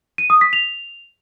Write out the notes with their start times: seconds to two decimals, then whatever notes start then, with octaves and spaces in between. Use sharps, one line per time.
0.18 D#7
0.30 D#6
0.41 B6
0.53 F7